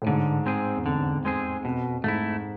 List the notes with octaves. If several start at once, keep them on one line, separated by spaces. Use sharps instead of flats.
A2
G#2 D3
G#3 C4 G#4
E2
F2 D3
G#3 C4 G#4
F2 B2
G#2 A3 E4